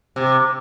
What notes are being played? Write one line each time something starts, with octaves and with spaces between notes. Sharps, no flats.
C3